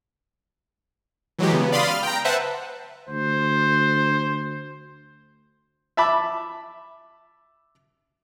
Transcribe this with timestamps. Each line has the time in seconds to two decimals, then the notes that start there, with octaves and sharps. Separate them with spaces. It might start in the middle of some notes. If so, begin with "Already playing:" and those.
1.39 E3 F#3 G#3 G4
1.52 C#3 B3
1.72 D5 F5 B5 C6 D#6
1.90 F6
2.03 G5 A#5
2.24 B4 C5 E5 F#5 A5
3.09 D2 C5
5.97 E5 A5 B5 D6